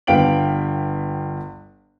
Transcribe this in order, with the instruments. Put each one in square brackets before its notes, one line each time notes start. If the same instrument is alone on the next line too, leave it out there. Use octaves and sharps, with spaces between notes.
[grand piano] G1 B3 F5 G5 D7 F#7